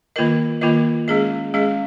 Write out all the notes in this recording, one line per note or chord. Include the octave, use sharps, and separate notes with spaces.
D#3 A#3 F4 A#4 D#5
D#3 A#3 F4 A#4 D#5
G#3 C#4 G#4 D#5
G#3 C#4 G#4 D#5